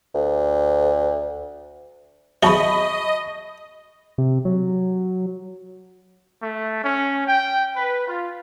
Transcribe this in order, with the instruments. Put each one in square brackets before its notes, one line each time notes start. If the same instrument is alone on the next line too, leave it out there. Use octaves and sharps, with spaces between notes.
[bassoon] D2
[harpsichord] E2 F#3 [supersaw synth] D#5 [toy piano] E5 A5 [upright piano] B5 C#6 G7
[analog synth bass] C3
F#3
[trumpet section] A3
C#4
G5
B4
F4